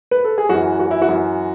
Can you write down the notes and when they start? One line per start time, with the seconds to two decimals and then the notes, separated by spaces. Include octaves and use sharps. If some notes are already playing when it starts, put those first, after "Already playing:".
0.11 B4
0.24 A4
0.38 G#4
0.49 F#2 E3 F#4
0.79 F#4
0.91 E4
1.02 F#4
1.09 F#2 E3